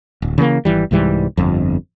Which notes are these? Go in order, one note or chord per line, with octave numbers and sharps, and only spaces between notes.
D1
C#3 E3 A3 A#3
G#1 E3 G3
C2 G#2 E3 G3
G1 F2